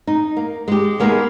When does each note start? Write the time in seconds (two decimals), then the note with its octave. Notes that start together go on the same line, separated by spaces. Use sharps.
0.07 D#4
0.37 A#3
0.68 G#3 G4
1.00 G#3 A#3 B3 D#4